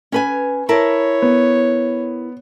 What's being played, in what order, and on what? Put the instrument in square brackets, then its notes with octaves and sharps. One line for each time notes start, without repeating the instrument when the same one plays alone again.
[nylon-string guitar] C#4 B4 G#5
[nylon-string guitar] E4 A#4 A5 [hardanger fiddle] C#5
[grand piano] B3